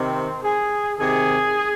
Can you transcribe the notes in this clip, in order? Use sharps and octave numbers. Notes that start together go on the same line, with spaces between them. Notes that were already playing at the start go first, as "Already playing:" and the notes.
Already playing: C3 D#3 C4
G#4
C3 D#3 G#4